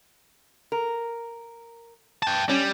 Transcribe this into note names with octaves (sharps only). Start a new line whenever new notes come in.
A#4
G5 A5
G3 C#4